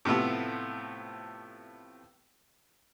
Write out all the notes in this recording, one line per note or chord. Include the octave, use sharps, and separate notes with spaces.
A2 C3 F3 A3 B3